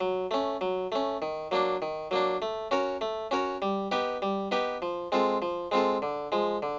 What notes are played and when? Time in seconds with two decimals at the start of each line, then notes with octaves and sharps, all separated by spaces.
0.01 F#3
0.31 A3 C#4
0.61 F#3
0.92 A3 C#4
1.22 D#3
1.51 F#3 A#3 D4
1.82 D#3
2.11 F#3 A#3 D4
2.42 A3
2.71 C#4 F#4 A#4 C#5
3.01 A3
3.31 C#4 F#4 A#4 C#5
3.62 G3
3.91 B3 D#4 G4 B4
4.22 G3
4.51 B3 D#4 G4 B4
4.82 F3
5.12 G#3 C4 F4 A4
5.42 F3
5.72 G#3 C4 F4 A4
6.02 D3
6.32 F3 G#3
6.62 D3